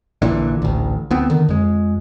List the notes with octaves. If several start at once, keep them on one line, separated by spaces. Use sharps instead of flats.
A#1 A#2 D3 E3
A1 D2
D2 B3 C4
D3 D#3
F2 G#3